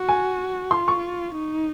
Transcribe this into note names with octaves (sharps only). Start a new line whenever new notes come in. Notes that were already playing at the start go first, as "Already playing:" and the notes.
Already playing: F#4
G#5
F4 C6
C#6
D#4